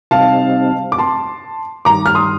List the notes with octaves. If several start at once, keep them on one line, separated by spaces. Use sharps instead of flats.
C3 G3 C4 D#4 F5 A5
D6
A5 C6
G2 D#3 G3 A#5 D6
F6
C6 D#6